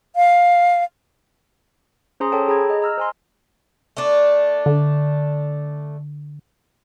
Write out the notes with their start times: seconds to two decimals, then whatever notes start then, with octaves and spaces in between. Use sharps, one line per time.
0.16 F5
2.20 C#4 G#4 C5 A#5 C6 D#6
2.32 A4 C#5 G5 A5
2.48 G#4 A#5 B5 G#6
2.70 D#5
2.82 A#5 E6 F6
2.98 C5 G#5 C6
3.97 A3 D4
4.66 D3